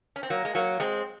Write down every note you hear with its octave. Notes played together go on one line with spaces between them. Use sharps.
C#4
C4
F#3 A#3
G#3
F#3 A#3
G#3 C4